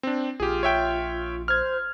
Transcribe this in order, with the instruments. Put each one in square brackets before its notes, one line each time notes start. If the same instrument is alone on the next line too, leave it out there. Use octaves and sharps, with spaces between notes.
[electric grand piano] C4 D4
[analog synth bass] A#1 [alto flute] F4 [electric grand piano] G4 G#4
[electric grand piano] C#5 E5 G5
[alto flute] C5 [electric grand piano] F6 G#6